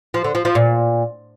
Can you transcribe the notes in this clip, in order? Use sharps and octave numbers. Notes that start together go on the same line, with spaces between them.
F3
D3
F3
F3
A#2